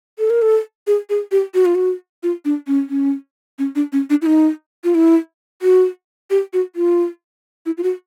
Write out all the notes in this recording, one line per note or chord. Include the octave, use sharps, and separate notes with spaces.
A4
A#4
A4
G#4
G#4
G4
F#4
F4
F#4
F4
D4
C#4
C#4
C#4
D4
C#4
D4
E4
D#4
F4
E4
F#4
G4
F#4
F4
E4
F4
F#4